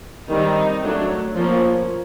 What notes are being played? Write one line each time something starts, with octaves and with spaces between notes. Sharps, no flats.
D#3 G3 C4 D#4
F#3 A3 D4
F3 A#3 C#4